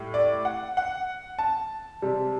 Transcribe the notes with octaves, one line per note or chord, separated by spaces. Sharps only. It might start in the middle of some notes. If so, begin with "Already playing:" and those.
Already playing: A2 G3
D5
F#5
F#5
A5
C3 G3